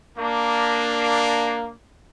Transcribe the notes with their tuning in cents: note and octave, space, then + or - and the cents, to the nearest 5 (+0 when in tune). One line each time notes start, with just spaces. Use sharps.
A#3 +0 D4 +0